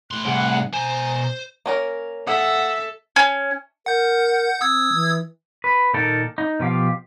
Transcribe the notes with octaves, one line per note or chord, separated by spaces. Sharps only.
A2 C6 F#6
C2 G#4 F#5 F#6
B2 C5 G#5 A#5 D#6
A#3 C#4 A#4
G#4 A4 E5 F#5
C#4
A#4 F#5 G6
C4 D#6 E6 G#6
E3
B4
A#2 D#3 D#4 A4 A#4
D#4
B2 F3 G4 F5